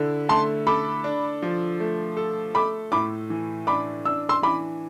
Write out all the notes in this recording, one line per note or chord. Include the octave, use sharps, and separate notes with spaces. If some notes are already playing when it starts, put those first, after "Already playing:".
Already playing: D3 E4
A3 A5 C6
A4 B5 D6
D4
F3
A3
A4
A3 B5 D6
A2 B5 D6
E3
D4 B5 D6
D4 E6
C6 E6
E3 B5 D6